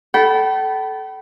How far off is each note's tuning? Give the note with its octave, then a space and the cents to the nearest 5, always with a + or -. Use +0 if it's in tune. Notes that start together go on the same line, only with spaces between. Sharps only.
A4 -15 G5 -45 B5 +0